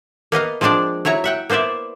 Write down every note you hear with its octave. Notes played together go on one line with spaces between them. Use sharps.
A#3 B3 D#5 F5
F3 G#3 C4 D4 D5
F#3 E4 C#5 A#5
E5 F#5 G5
A#3 B3 C5 D5 E5